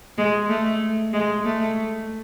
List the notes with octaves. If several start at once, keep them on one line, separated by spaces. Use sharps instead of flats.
G#3
A3
G#3
A3